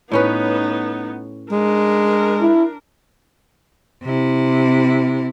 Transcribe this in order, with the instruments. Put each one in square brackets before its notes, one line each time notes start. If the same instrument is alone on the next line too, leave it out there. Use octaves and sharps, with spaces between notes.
[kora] A2 C#4 B4 [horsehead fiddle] B3 D#4
[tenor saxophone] G#3 [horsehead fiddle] D4 A#4
[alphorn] E4
[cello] C3 E4